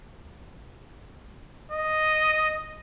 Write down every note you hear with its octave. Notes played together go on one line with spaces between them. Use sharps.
D#5